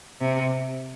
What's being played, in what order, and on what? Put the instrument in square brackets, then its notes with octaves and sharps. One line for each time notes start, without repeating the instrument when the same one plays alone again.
[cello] C3